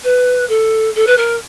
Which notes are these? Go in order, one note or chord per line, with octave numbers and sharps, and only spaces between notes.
B4
A4
A4
B4
A#4